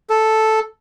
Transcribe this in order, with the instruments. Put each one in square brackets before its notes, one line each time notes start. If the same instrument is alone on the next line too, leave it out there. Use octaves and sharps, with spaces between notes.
[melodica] A4